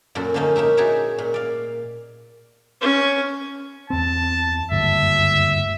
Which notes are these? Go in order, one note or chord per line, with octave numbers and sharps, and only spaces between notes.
F#2 A#2 F#4 A4
D3 F3 A#3 C#4 D#4
A#3 D#4 G4 E5
D#4 F#4 G#4 C#5 D5 E5
A#2
D5 F5
C#4
E2 C4 A5
F#1 D2 G2 E5